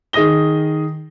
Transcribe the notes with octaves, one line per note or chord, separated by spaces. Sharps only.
D#3 G#4 D#5 D#6 A#6 G7